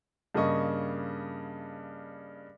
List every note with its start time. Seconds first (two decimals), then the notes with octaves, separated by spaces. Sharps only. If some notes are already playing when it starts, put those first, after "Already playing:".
0.34 G2 C#3 A#3 D#5 C#6